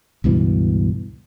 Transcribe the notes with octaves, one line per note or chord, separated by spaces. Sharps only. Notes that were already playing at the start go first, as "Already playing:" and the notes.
C#2 G2 B2 E3